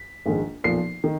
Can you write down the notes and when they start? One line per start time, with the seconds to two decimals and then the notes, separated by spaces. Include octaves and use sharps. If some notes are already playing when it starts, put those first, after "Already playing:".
Already playing: B6
0.26 A#1 G#2 D#3
0.64 B1 A#2 F3 C7
1.04 D#3